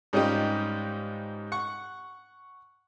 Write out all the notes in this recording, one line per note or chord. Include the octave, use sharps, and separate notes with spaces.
G#2 G3 C#4 D#4 F4 G4
F#5 C#6